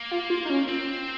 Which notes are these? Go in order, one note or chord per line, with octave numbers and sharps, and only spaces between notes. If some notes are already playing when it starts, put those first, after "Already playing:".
Already playing: A#3
F4
F4
D#4
C#4
C4